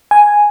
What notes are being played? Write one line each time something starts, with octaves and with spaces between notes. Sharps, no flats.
G#5